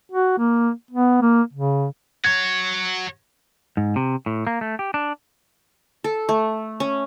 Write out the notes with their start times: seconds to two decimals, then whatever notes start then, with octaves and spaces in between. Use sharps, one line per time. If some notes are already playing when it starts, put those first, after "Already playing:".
0.12 F#4
0.38 A#3
0.91 B3
1.22 A#3
1.53 C#3
2.25 F#4 C#5 G#6
3.77 G#2
3.96 C3
4.26 A2
4.47 A#3
4.61 A3
4.79 G4
4.94 D4
6.04 A4
6.29 A3
6.80 C#4